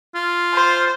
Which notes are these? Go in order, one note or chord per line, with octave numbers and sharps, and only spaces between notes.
F4
C5